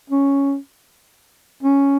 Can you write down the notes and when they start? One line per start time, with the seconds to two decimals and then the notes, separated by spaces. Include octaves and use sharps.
0.10 C#4
1.63 C#4